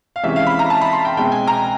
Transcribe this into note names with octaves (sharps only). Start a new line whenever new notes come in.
F5
C3 E3 G#3 C#4 E5
F5
B5
A#5
A5
B5
C6
G5
B2 G#3 C4 G5
G#5
A#5